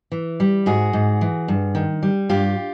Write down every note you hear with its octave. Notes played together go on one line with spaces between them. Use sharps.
E3
G3
G#2 F#4 G#4
G#2
E3
G2
D#3
G3
G2 F4 G4